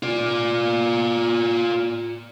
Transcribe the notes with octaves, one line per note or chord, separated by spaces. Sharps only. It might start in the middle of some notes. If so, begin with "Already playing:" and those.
F4 D5